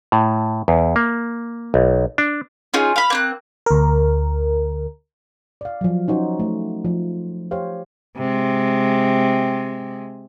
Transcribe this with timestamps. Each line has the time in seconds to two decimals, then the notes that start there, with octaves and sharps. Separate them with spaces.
0.12 A2
0.68 E2
0.96 A#3
1.74 B1
2.18 D4
2.74 C#4 D#4 F4 G#4
2.96 F5 B5
3.10 A#3 C4 F#6
3.66 D2 A#4
5.61 D5 F5
5.81 F3 F#3
6.08 C#4 D#4 F#4 C5
6.39 A3
6.85 F3
7.51 G4 C5 C#5 F5
8.17 C3 G#3